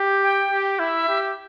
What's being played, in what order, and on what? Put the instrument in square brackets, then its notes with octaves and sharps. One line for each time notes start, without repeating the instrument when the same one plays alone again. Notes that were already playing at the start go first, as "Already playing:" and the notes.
Already playing: [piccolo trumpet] G4
[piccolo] G5
[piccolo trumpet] G4
[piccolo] G5
[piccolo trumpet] E4 [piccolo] E5
[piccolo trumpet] G4